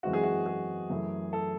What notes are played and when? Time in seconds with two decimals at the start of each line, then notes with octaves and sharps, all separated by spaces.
0.03 F#2 E3 G#3 C4 F#4
0.13 G#4
0.23 F#4
0.46 G#4
0.90 F#2 E3 A3
1.33 A4